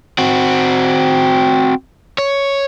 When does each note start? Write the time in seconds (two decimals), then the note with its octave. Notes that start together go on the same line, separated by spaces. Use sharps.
0.18 C4 F#4
2.18 C#5